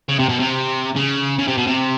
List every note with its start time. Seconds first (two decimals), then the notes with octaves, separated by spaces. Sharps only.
0.09 C#3
0.19 C3
0.29 B2
0.39 C3
0.96 C#3
1.38 C#3
1.48 C3
1.57 B2
1.67 C3